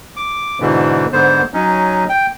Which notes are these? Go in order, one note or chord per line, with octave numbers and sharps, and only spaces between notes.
D6
G#2 B2 D3 E3
G#2 D3 B3 C5
F#3 C#4 D#4
G5